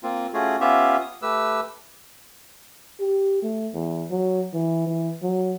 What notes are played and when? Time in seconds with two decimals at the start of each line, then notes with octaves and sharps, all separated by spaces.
0.03 A#3 C4 F4
0.34 A3 C#4 F4 F#4 G#4
0.61 B3 C#4 F4 G4 E5 F5
1.01 D#6
1.22 A3 G4 B4 E6
3.00 G4
3.43 A3
3.74 E2
4.11 F#3
4.53 E3
4.87 E3
5.23 F#3